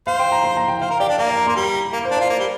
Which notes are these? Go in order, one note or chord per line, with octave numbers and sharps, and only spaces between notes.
C5 F5
G5
A#5
C6
A#5
G5
C5 F5
A#4
G4 D5
D4
A#3 D5
F5
A#5
A#3 C6
G3 A#5
A#5
A#3 F5
C5
D4
F4 D5
A#3
G3